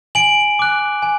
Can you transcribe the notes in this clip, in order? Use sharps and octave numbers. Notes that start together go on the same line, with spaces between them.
G#5 D7 F#7
D6 F#6
G#5